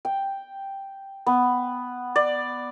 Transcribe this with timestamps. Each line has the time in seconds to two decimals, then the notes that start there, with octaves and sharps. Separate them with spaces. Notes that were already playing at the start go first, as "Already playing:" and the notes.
0.05 G5
1.27 B3
2.16 D5